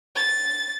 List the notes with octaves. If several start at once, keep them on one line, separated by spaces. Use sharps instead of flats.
A6